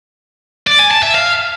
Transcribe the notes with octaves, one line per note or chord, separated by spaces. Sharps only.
D5
G#5
A5
E5
F5